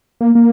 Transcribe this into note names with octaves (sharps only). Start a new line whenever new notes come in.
A#3
A#3